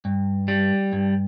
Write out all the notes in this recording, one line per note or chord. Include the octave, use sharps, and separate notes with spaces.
G2
G3
G2